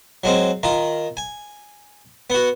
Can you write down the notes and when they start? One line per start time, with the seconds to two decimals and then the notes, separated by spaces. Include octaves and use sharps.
0.24 F#3 G#3 C4
0.63 D#3 F4 A#5
1.17 G#5
2.30 B3 F#4